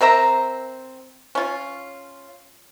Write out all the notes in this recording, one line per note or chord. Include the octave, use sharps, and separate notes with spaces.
C4 A#4 E5 A#5
C#4 F4